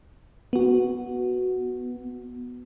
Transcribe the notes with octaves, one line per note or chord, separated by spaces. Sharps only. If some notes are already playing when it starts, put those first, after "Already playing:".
B3 F#4